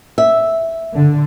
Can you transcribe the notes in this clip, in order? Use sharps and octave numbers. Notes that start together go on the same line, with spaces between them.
E5
D3